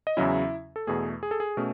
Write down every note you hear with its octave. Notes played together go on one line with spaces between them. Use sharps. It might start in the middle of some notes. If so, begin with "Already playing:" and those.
D#5
E2 C#3 F#3 C#4 E4 E5
A4
E2 B2 A3 G#4
G#4
A4
G#4
B2 A3 C#4